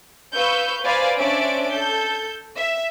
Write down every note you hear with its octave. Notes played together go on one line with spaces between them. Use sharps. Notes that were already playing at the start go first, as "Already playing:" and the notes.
B4 F5 C#6 E6 G6
B4 C5 D5 F5 G#5 B5
C#4 D4 C5 D5 E5 D7
A4 G6
E5